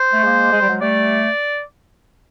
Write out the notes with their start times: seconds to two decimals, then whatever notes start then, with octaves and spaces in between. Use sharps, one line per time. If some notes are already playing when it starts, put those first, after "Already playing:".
Already playing: C5
0.12 A3
0.22 G#3 A#3
0.51 G#3
0.60 G3
0.68 F#3 G#3
0.81 G3 A3 D5